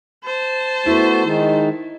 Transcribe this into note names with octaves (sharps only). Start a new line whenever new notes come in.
C5 A5
A3 B3 E4 F#4
D#3 G#3 D#4